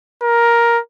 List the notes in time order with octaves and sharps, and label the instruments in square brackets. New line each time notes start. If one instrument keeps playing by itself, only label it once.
[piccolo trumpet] A#4